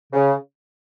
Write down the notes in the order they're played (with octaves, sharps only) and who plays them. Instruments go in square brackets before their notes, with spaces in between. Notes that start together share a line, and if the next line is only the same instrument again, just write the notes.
[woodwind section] C#3